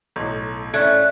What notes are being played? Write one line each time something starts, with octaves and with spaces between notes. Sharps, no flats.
B1 A2
A2 A3 C#4 D5 F#6 G#6